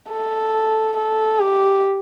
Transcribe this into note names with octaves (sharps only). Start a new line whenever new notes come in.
A4
A4
G4